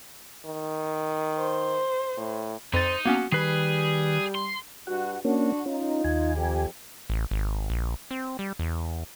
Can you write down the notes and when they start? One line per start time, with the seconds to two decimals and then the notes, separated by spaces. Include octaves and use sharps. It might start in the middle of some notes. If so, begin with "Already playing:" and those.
0.45 D#3
1.38 C5
2.17 A2
2.74 F2 D#4 C5 A6
3.06 A#3 B3 C#4 F#4
3.32 D#3 G3 G#4 B4 C7
4.35 C6
4.87 G2 F#4 F#5
5.25 A#3 C#4 D4 F#4
5.66 C#4 D#4 F4
6.04 D#2 G#5
6.34 F2 G4
7.10 A1
7.31 G#1
7.70 A#1
8.11 C4
8.39 G3
8.59 E2